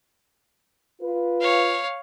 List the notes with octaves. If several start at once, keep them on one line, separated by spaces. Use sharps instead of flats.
F4 B4
C#5 F5